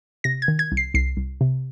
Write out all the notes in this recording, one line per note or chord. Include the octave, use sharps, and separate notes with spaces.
C3 A#6
G#6
D#3
G#6
C2
C7
C2 C7
C2
C3